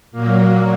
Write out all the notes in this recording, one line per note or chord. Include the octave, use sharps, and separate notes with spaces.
A#2 F#3 A#3